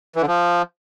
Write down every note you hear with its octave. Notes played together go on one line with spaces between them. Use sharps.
E3
D3
F3